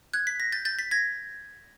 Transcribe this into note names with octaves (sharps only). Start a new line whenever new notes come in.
F#6 G#6
B6
A#6
G6 A6
G6 A6
A6 B6
G#6 A#6